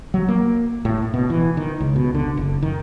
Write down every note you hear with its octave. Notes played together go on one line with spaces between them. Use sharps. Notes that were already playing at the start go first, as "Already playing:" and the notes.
F#3
A#3
A2
B2
E3
D#3
C#2
B2
D3
F#1
D#3